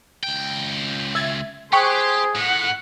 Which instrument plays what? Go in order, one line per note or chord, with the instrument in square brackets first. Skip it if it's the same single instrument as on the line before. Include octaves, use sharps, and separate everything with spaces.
[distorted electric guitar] C#2 G5
[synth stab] E5 G#6 A6
[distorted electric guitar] G4 [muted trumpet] G#4 [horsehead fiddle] C5 [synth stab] G5 C#6 F#6
[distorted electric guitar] A2 [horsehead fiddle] F#5